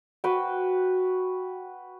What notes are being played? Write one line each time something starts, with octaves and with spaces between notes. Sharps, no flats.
F#4 B4 G5